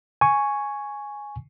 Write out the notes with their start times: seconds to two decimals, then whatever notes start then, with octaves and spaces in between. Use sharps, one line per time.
0.21 G#5 C#6